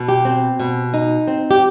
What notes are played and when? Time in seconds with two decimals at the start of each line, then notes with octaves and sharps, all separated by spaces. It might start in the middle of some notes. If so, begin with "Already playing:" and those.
Already playing: B2
0.08 G4
0.25 C4
0.60 B2
0.94 D#4
1.28 C4
1.51 G4